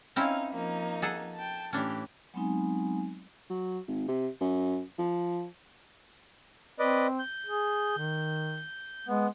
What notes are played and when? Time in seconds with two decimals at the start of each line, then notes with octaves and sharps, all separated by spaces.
0.16 C4 C#4 D#4 E4 F5
0.53 F3 A#3 D#4
1.02 G#4 A4 F#5
1.35 G5 A5
1.73 A2 E3 C#4 D4 G4
2.34 F#3 G#3 B3 C4 D#4 G#5
3.50 F#3
3.87 G#1
4.08 C3
4.41 F#2
4.99 F3
6.79 C4 B4 D5 D#5
7.19 G6
7.46 G#4
7.98 D#3
9.07 G#3 B3